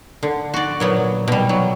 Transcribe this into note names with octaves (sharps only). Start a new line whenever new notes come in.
D3
F#4 D5
A#2 F#3 B3
B2 G3
F#3